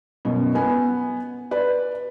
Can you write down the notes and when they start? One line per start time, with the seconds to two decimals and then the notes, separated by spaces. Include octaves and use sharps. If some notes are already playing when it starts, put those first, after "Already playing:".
0.25 F#2 B2
0.55 B3 G#5
1.51 B4 D5